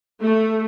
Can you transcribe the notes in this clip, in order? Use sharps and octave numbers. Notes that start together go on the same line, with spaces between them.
A3